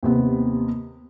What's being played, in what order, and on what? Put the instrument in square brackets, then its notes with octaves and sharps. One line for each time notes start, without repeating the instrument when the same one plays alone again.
[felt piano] D#2 C3 B3